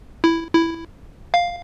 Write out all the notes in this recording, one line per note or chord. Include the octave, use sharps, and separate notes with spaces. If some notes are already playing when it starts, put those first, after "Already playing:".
E4
E4
F5